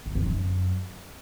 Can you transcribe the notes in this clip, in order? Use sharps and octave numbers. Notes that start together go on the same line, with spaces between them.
E2
F2
F#2